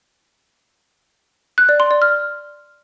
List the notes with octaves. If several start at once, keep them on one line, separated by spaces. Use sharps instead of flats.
F#6
D5
C6
D5
F6